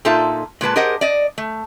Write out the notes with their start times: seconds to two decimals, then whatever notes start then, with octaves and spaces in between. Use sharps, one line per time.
0.05 A#2 D#4 F4 A4 E5 A5
0.61 A#2 G#3 B4 A5
0.76 G4 G#4 A#4 C5 D#5 F#5
1.01 D5 D#5
1.38 A3